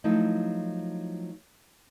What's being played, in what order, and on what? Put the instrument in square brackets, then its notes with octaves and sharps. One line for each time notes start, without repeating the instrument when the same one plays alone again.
[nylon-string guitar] F3 F#3 A3 D#4 E4